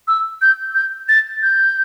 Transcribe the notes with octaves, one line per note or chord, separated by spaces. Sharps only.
E6
G6
G6
A6
G6